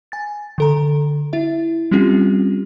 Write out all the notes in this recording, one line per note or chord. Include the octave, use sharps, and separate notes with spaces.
G#5 A6
D3 A4 A#5
E4 E5
G3 C4 C#4 F4 G4